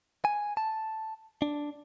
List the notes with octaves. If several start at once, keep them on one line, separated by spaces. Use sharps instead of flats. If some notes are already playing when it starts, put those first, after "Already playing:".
G#5
A5
D4